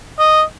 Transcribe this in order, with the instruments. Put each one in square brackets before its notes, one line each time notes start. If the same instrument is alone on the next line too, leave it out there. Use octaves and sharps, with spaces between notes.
[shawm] D#5